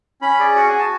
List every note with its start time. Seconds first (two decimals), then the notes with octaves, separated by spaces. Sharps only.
0.21 C#4 B5
0.39 G#4 D5
0.56 F#4 F#5
0.68 F#4 G#5
0.79 A5